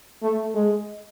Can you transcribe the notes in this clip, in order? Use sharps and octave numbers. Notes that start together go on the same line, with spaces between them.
A3
G#3